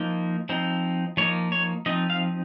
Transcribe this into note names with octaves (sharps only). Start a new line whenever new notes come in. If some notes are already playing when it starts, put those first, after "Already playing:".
Already playing: F3 A#3 D#4
F3 C4 D#4
F3 A#3 D#4 C#5
C#5
F3 C4 D#4 D#5
F5